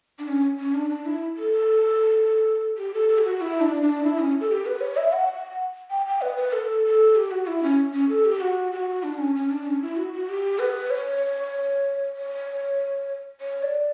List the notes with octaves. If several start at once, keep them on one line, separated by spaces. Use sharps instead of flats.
D4
C#4
C#4
D4
D4
E4
A4
G4
A4
A4
G4
F#4
E4
D4
D4
E4
C#4
A4
G4
B4
C#5
E5
F#5
G5
G5
B4
B4
A4
A4
G4
F#4
E4
C#4
C#4
A4
G4
F#4
G4
F#4
D4
C#4
C#4
D4
C#4
E4
F#4
F#4
G4
B4
C#5
C#5
C#5
D5